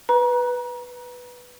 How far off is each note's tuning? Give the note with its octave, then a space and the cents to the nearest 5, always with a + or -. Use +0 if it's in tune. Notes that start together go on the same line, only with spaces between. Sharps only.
B4 +0 A#5 +35